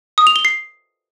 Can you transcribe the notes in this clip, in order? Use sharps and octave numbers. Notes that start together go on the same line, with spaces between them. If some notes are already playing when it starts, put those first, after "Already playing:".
D#6
F7
G7
C7